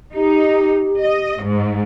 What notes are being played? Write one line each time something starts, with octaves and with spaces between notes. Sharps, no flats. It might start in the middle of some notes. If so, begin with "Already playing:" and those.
D#4 G4
D#5
G#2